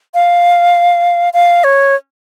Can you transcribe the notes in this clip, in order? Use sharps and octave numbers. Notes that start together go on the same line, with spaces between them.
F5
F5
C#5